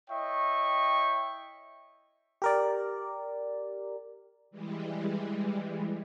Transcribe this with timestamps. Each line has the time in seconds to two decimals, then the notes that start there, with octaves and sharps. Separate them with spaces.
0.10 E4 C#5 D#5 E5 G5 C#6
2.42 G4 A#4 D5
4.51 E3 G3 G#3